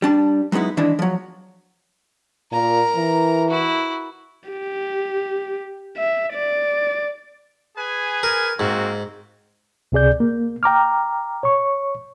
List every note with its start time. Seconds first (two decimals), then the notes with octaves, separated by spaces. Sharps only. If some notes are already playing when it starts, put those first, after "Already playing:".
0.02 G3 D4 A5
0.52 F#3 G#3 B3 D#4 E4
0.77 D#3 E3 G#3 D4 E4
0.99 F3 F#3
2.52 A#2 A#4 A#5
2.95 E3
3.50 E4 F#4
4.50 G4
5.97 E5
6.33 D5
7.77 G#4 B4 G#5
8.23 A#4
8.60 G#2 A#3 C4 F#4
9.92 C#2 C3 G#4 D5 G6
10.20 A#3
10.63 G5 A#5 D6 F6
11.43 C#5 C#6